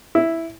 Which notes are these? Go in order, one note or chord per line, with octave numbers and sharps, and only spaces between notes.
E4